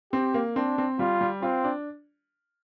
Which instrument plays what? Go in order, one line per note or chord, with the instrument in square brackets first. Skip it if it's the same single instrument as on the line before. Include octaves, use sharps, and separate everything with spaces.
[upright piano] C4 [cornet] G4
[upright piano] A#3
[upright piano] C4 [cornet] D4
[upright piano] C4
[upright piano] G3 [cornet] F4
[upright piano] G3
[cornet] C4 [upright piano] F4
[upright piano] D4